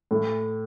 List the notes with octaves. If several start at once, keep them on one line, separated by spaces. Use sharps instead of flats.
A2